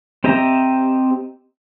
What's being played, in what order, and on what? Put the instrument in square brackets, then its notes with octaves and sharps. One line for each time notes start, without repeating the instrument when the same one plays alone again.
[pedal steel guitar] C4 G4 D#5 E5 A#5